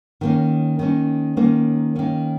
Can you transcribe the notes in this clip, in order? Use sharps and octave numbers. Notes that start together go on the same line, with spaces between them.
D#3 A#3 C#4
D#3 A#3 C#4
D#3 A#3 C#4
D#3 A#3 C#4